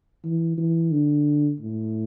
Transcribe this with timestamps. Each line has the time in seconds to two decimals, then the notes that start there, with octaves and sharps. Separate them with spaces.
0.24 E3
0.58 E3
0.91 D3
1.60 A2